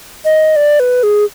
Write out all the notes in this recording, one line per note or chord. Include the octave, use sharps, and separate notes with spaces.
D#5
D5
B4
G#4